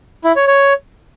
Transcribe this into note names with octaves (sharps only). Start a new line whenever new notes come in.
E4
C#5
C#5